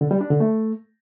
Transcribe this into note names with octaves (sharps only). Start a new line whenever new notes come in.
D3
G3
D4
D3
A3